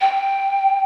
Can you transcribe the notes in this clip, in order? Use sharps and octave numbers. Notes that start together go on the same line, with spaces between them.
G5